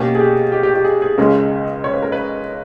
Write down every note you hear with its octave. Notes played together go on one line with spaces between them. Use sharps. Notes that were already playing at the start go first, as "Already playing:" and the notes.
Already playing: B2 A#3 C#4 G4
G#4
G4
G4
G4
G4
G#4
G#4
C#2 C#3 G#3 C#4 A#4
C#5
B4
A#4
B4